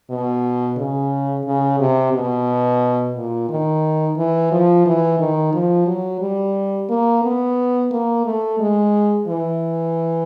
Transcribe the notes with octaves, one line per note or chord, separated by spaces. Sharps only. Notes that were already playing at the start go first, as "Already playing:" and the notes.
B2
C#3
C#3
C3
B2
A#2
D#3
E3
F3
E3
D#3
F3
F#3
G3
A#3
B3
A#3
A3
G#3
E3